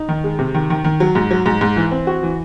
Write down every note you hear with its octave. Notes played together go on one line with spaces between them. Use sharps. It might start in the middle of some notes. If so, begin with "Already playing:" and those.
Already playing: D#4
D#3
G#3
C3
D#3
D#3
D#3
F#3
G#2
F#3
G#2
G#2
E3
C4
F#4
E3